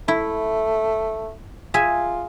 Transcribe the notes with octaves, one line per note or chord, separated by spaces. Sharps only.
A3 E4
F4 G#4 E5 G#5